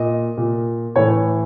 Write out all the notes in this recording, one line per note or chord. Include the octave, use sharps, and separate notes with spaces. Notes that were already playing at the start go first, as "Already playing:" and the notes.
Already playing: A#2 D#5
A#2
A2 E3 C#5